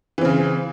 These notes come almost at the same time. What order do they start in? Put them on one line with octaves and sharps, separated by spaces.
E3 C4 C#3